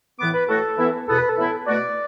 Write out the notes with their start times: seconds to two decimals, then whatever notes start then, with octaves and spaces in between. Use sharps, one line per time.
0.18 A2 E3 B3 D6
0.34 B4
0.48 A2 A3 F#4 A4
0.77 E3 B3 E4
1.07 E2 B2 B3 A4
1.18 B4
1.29 A4
1.37 A2 E3 B3 E4
1.66 B2 A3 F#4 D5